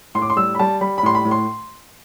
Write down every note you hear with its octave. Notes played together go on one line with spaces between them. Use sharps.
A2 C6
D6
C6
G3 E6
B5
G3 A5
G3 B5
B5
A2 C6
B5
A2
C6